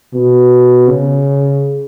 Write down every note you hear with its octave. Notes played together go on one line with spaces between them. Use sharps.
B2
C#3